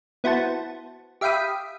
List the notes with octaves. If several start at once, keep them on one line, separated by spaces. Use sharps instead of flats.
B3 E4 F#4 C5 A5
G4 E5 F5 G5 B5 D#6